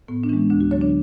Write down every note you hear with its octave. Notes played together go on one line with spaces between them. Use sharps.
A2 B3
D4
E3 G#3 C#4
D2 D4
F#4
D3 F#3 C#5
D4